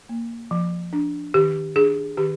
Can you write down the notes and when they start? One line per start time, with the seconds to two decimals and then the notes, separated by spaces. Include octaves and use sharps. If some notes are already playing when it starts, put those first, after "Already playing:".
0.09 A#3
0.51 F3
0.93 D4
1.34 D#3 G4
1.76 D4 G#4
2.17 D#3 G4